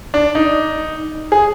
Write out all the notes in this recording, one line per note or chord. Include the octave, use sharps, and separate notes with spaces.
D4
D#4
G#4